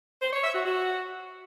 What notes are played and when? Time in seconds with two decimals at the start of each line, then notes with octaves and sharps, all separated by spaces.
0.22 C5
0.33 C#5
0.44 E5
0.55 F#4
0.66 F#4